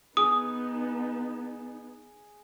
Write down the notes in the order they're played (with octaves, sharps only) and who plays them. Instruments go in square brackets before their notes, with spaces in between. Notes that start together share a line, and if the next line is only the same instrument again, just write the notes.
[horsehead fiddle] B3 D#4 [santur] G#4 [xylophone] D#6